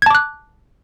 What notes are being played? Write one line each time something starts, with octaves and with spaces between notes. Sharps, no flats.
A5 D6 F#6 G#6